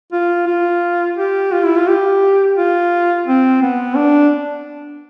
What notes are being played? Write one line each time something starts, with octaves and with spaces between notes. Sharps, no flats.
F4
F4
G4
F4
E4
F4
G4
F4
C4
B3
D4